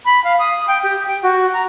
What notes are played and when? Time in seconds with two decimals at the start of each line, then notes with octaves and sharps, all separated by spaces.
0.05 B5
0.24 F5
0.39 D#6
0.68 G5
0.84 G4
1.07 G5
1.23 F#4
1.53 A#5